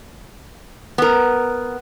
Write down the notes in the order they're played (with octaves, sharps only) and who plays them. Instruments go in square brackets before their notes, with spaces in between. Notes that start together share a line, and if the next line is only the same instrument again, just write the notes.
[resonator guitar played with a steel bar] B3 A#4